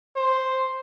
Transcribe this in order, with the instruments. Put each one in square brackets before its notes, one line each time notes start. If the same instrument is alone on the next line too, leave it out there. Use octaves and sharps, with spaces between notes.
[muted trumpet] C5